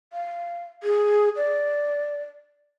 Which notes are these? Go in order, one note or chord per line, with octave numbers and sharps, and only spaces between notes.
F5
G#4
D5